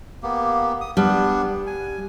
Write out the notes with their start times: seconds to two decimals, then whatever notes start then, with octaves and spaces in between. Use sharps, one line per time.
0.23 A#3 B3 G4
0.81 D#6
0.97 G3 B3 D4
1.67 G#5